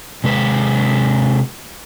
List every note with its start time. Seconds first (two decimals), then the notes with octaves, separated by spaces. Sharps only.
0.24 C3 G#3 B4